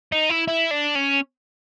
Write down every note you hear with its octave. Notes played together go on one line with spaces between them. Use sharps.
D#4
E4
E4
D4
C#4